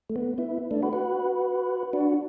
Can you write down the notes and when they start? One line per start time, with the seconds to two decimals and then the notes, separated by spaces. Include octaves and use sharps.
0.09 A3
0.16 B3
0.38 B3 E4
0.71 A3 D4
0.83 F#4 B4
0.93 F#4 B4
1.93 D4 F#4